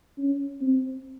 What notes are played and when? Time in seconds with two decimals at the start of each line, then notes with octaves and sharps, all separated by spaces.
0.18 C#4
0.61 C4